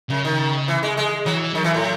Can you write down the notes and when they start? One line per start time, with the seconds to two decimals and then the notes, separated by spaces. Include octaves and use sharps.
0.10 F#2 C#3
0.25 D#3
0.68 E3
0.83 G#3
0.97 G#3
1.26 E3 F#3
1.55 D#3 F#3
1.64 E3
1.74 A2